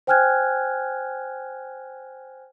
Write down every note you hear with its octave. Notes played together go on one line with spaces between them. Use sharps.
C5 G5 G#5 F6 F#6 G#6